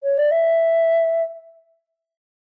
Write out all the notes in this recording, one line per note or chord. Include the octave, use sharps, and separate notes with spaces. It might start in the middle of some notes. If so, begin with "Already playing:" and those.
C#5
D5
E5